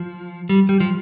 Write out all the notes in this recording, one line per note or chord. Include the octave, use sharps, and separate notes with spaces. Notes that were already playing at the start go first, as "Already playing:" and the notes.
Already playing: F3
G3
G3
F3